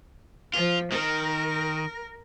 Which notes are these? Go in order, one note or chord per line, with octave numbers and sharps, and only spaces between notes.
F3 F4
D#3 A#4